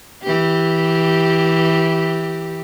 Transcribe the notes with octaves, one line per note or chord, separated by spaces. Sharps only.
E3 G4